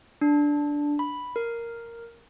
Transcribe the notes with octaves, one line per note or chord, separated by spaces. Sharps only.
D4
B5
A#4